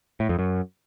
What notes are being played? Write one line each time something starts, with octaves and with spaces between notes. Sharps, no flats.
A2
F2
F#2